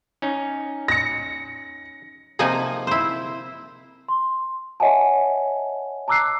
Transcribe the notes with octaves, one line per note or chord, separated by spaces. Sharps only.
C#4 D#4
A#6 C#7
C3 F3 A#3 D#4 G#5
E4 C5
C6
C#5 D#5 E5 F#5 G#5 A5
A5 A#5 D6 E6 F#6 C7